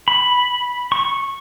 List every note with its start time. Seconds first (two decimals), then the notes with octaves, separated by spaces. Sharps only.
0.08 B5
0.92 C#6